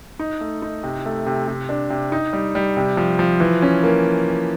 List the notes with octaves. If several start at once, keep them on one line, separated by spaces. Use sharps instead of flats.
D#4
A3
D#4
C3
A3
C3
C3
D4
C3
D#4
G3
G3
C3
F3
F3
E3
C#4
A#3